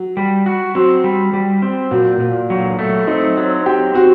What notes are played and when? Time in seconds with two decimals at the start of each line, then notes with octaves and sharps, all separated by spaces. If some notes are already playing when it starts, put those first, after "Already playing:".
Already playing: F#3
0.17 G3
0.46 F#4
0.75 F#3 C4
1.04 G3
1.33 G3
1.62 C4
1.91 A#2 F#3
2.20 A#2
2.50 F#3
2.79 A3
3.07 C4 D#4
3.37 F#3
3.66 C4 G4
3.94 C4 F#4